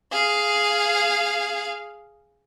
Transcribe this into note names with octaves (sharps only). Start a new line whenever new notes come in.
G#4 F5